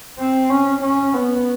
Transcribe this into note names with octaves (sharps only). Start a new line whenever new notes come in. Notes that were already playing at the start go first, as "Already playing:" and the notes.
C4
C#4
C#4
B3